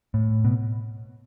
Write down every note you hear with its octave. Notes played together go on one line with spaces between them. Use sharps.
A2
B2